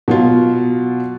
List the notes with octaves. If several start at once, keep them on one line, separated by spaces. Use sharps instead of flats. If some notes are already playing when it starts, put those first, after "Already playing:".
B2 F#3 F4